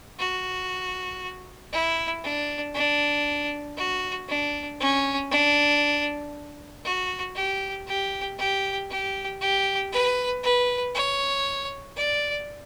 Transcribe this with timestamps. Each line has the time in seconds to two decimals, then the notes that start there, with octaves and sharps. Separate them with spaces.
0.19 F#4
1.73 E4
2.23 D4
2.75 D4
3.77 F#4
4.29 D4
4.80 C#4
5.31 D4
6.84 F#4
7.35 G4
7.87 G4
8.39 G4
8.90 G4
9.41 G4
9.92 B4
10.43 B4
10.95 C#5
11.97 D5